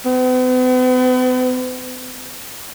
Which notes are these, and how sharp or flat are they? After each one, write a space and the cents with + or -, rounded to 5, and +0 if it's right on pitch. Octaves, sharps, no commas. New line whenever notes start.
B3 +45